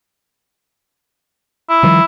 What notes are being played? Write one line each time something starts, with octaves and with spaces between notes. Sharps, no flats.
E4
D#3 F3 G3